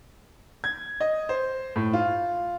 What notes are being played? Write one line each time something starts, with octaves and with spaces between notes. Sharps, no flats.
G#6
D#5
C5
A2
F4